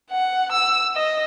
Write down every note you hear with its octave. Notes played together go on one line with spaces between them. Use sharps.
F#5
E6
D#5